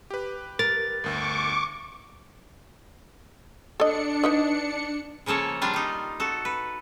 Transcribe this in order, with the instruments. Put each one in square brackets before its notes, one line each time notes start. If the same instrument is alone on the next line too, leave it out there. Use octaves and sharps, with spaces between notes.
[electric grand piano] G4 B4
[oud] A#4 [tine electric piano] A6
[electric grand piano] G1 D2 [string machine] C#6 D6
[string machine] D4 C#7 [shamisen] A4 D#5
[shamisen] D#4 B4 D#5
[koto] C#3 F3 A#3 A4 C#5
G3 D4 F4
G3 D#4
F#4 A4
B4